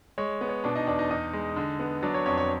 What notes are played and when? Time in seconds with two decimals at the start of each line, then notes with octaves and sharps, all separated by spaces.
0.18 G#3 C#5
0.41 B3
0.49 C#5
0.64 B2 D4 D5
0.75 D#4 D#5
0.87 E2 D4 D5
0.99 D#4 D#5
1.10 E2 D#4 D#5
1.33 G#3
1.56 D3
1.80 B3
2.03 F#3 D4 D5
2.14 C#5
2.26 F2 C#5
2.37 C#5